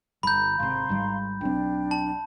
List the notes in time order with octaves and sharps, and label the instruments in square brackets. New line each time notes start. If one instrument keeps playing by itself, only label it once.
[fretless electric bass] G1 [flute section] A#5 [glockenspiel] B5 G6
[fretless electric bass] G#1 C3 [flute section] F5 A#5 C6
[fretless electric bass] G#1 G#2 G3
[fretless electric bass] B1 C4 [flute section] D4 G5
[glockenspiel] A5